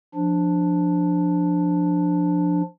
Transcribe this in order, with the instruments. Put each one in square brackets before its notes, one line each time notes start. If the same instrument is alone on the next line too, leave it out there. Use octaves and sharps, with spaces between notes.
[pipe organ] F3 D4